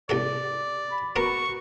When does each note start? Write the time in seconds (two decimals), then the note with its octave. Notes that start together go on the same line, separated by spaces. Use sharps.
0.09 C2 B2 A4 D5
0.90 B5
1.16 B3 F#4 A#4 C#6